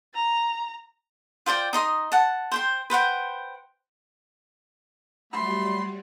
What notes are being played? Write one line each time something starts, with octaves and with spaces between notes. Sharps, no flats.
A#5
F4 C5 D5 G5
D#4 D#5 C6
F#5 A5
C5 G5 C6
B4 C5 F#5 G5
F#3 G3 A3 B5 C6